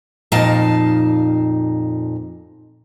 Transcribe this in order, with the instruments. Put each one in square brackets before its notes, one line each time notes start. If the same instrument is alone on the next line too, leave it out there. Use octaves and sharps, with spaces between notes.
[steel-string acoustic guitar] F2 A#2 D#4 F5 A5